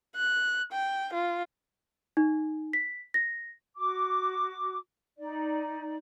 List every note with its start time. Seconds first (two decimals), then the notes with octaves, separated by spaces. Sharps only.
0.16 F#6
0.72 G5
1.13 F4
2.17 D#4
2.73 B6
3.14 A#6
3.77 F#4 D6
5.18 D#4 D5